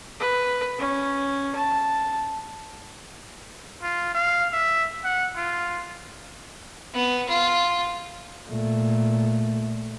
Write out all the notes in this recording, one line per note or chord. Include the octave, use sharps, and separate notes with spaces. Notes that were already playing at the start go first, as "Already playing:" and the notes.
B4
C#4
A5
F4
F5
E5
F#5
F4
B3
F4
A#2 A3